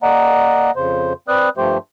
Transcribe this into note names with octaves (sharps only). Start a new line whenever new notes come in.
A#3 D5 D#5 F#5 A#5
F2 C#3 C5
C4 B4 D5 D#6 F#6
G2 F3 A3 G4 C5